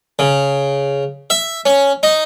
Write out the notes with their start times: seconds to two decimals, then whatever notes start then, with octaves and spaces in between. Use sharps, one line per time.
0.19 C#3
1.30 E5
1.66 C#4
2.03 D#4